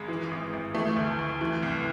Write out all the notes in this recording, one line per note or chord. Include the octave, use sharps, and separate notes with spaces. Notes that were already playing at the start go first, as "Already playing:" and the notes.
Already playing: G#1 G#3
E3
G#1
G#1
E3 A3
D2
D2
E3
C2